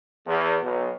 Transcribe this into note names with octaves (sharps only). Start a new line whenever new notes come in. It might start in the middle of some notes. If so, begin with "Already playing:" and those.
E2
B1